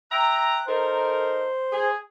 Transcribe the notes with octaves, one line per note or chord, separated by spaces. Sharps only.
E5 G5 A#5 F#6
D#4 A4 A#4 C5 C6
G#4